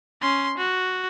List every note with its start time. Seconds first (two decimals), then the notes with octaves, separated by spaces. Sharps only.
0.22 C#4 C6
0.58 F#4